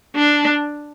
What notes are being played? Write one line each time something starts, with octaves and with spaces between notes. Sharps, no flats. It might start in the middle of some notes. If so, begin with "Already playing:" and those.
D4